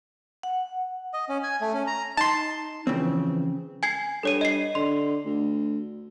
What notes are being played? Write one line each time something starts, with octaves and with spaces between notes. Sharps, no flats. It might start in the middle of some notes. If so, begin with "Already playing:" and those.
F#5
D#5
C#4
G#5
A3
C#4
A#5
D#4 A5 C6
C#3 E3 F3 C4
G#5 G#6 C7
G2 A4 C#5 D#7
D#5 C7
D3 C6
D2